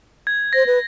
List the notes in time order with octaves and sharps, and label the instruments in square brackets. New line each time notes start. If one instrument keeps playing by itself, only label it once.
[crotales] G#6
[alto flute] C5 [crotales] A#6
[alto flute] B4